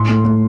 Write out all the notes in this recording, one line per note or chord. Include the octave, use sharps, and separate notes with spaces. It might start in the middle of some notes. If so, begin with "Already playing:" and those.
Already playing: A2 C6
A3
A3